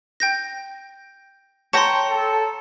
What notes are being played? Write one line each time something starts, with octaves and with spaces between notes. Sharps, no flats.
G5 G6 A#6
C#5 G5 A5 A#5 C6
A4